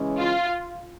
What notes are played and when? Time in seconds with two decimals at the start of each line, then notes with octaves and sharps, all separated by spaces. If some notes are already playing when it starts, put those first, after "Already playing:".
Already playing: C#3 E3 G#3 C#4
0.18 F4